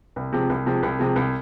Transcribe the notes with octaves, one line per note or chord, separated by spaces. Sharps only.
C2
C3 F3 G#3
C2
C3 F3 G#3
C2
C3 F3 G#3
C2